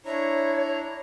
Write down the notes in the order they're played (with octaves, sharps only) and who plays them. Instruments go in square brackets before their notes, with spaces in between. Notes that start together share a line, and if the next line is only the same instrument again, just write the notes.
[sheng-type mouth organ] D4 E4 A#5 [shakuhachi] C#5